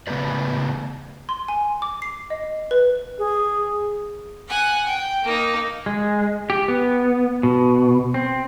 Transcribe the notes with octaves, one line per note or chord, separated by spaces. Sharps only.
C#3 A3 B3 B4 D5
C6
G#5
D6
C7
D#5
B4
G#4
F#5 G#5
G5
A#3 D#4
G#3
G4
B3
B2
C4